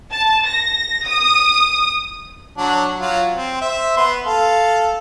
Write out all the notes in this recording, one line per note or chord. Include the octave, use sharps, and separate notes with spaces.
A5
A#6
D#6
F#3 D4
F#3 F4
C4
C5 E5
B3 C6
A4 F5